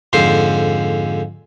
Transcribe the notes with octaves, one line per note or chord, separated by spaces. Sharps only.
F2 G#2 D3 C5 C6